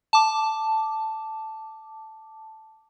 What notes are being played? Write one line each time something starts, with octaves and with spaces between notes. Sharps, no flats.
A5 D6